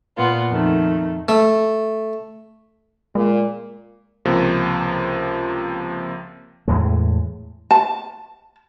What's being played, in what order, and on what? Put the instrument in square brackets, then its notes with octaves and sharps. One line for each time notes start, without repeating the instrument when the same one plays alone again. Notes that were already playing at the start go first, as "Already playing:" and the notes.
[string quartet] A#2 A#3 B3 F4
F2 D#3 A3
[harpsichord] A3
[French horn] A#2 [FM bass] G#3
[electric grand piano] C#2 C3 F3 A#3
[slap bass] E2 A2 G#3
[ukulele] A5